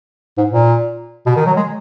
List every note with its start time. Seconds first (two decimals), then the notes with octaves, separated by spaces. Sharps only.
0.37 G#2
0.52 A#2
1.26 B2
1.36 D#3
1.47 F#3
1.56 G#3